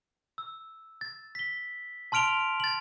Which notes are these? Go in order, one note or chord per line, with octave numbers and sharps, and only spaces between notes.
E6
A6
B6 G7
A5 C6 F6 D7 F7 G7
A6 F#7